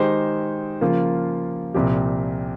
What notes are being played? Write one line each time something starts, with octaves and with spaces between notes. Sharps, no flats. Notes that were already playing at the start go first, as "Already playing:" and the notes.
Already playing: D#3 G#3 D#4 G4 C5
C#3 F3 A#3 F4
C2 A#2 F3 C4 G4